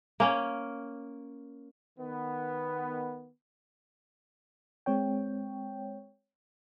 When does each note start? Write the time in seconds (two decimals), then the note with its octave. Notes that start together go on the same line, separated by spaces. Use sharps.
0.20 A#3 C#4
1.99 D#3 B3
4.86 G#3 C4 C#5 G5